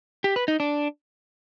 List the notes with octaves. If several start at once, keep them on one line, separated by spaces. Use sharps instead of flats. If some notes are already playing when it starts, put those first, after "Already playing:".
G4
B4
D#4
D4